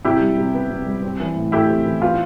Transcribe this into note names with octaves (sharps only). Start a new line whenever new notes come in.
C3 E4 G4
G3
C3
B3
C3
G3
C4
E3
A2
A3 E4 G4
C4
E3
B3 F4